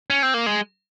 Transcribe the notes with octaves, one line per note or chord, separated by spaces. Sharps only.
C#4
C4
A#3
G#3